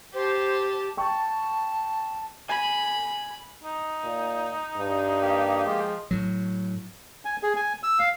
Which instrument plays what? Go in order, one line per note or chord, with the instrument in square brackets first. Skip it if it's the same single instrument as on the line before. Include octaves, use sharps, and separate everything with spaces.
[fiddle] G4 A5 [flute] C5
[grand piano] G5 C#6 [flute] A5
[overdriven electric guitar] G#5 [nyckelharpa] B5
[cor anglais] D#4
[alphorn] A#2
G2
[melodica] A#3 G4
[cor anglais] F3 [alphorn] G#3
[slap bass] A2 F#3
[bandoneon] G#5
G#4
G#5
E6
F5